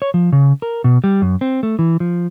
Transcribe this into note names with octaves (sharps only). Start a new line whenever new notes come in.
C#5
F3
C#3
A#4
B2
G3
F#2
C4
A3
E3
F3